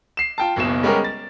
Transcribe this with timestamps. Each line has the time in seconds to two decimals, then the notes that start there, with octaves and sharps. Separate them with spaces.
0.17 C7 E7
0.38 F4 G5 A5
0.56 F#1 B1 B2 E7
0.83 G3 G#3 B3 C#4 G4 A#4
1.04 A6